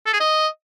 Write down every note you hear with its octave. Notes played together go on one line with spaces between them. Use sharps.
A4
G#4
D#5